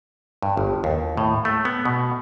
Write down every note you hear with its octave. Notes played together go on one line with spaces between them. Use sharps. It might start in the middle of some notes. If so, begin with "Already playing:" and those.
G2
G1
D#2
A2
A3
B3
B2